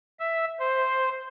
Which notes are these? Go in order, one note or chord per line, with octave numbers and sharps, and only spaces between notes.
E5
C5